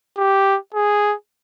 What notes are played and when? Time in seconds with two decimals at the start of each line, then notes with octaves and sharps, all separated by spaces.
0.17 G4
0.74 G#4